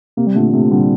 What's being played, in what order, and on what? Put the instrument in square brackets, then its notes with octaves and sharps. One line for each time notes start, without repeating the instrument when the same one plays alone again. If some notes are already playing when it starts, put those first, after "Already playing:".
[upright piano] C3 [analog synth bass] A#3
[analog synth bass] G3
[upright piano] A#2 D3 [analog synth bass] A3
[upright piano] C3 [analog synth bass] A3
[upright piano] A#2 D3 [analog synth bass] G3